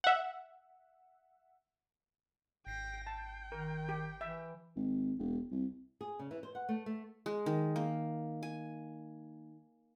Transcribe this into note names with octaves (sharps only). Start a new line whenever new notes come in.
E5 F#5
G#1 G5 A#6 C7
G5 A5
D#3 A#4
G4
E3 E5
G#1
E1
C2
G#4
C#3
E3
C5
F#5
A3
A3
G#3
D#3
A#3
G#5